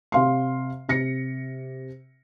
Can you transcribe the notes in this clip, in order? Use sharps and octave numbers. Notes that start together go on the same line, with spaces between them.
C3 F5 C6
C3 A#6 C#7